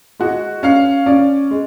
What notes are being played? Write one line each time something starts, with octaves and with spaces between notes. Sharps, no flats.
G#3 F#4
C#4 F5
C#4 D5
G#3